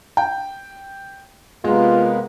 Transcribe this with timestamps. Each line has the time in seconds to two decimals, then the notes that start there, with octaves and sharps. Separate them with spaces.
0.17 G5
1.64 C3 G#3 A#3 B3 F4